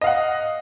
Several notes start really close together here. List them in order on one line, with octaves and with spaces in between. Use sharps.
D#5 F5 F#5